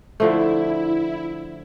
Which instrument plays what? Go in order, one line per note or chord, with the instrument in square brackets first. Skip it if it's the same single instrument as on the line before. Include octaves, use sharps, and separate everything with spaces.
[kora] D3 F3 A3 [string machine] E4